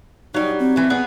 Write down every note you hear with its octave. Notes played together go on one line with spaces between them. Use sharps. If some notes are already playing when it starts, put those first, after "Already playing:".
F#3 G3 D#4
C4
E3 A3
B3 G#4 D5